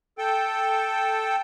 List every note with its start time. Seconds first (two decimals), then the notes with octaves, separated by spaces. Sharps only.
0.18 A4 G5